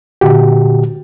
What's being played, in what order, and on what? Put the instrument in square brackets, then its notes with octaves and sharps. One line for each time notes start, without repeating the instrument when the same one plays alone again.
[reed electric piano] A#2 D3 F#4 G4